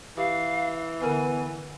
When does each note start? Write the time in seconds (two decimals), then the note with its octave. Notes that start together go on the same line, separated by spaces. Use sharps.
0.17 E3 G4 F5
1.01 D3 B3 A#4 B4 G#5